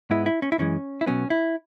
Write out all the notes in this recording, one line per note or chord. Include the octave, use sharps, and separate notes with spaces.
G#2 G#3 B3 E4
E4
C#4
E4
F#2 E3 G#3 C#4
E4
B1 B2 F#3 B3 C#4
E4